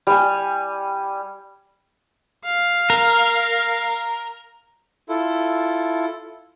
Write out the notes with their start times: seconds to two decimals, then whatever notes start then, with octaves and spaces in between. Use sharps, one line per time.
0.07 G3 G#5
2.45 F5
2.90 A#4
5.09 E4 F4 A4